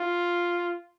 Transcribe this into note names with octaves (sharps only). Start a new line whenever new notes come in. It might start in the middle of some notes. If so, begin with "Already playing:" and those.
Already playing: F4